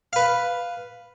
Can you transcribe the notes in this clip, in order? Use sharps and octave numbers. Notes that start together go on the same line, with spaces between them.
B4 F5